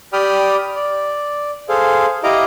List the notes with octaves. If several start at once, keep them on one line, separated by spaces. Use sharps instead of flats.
G4 D5 G5 B5 D#6 F6
D5
G#4 A4 C5 F5
E4 G4 D#5 F5 A#5 D6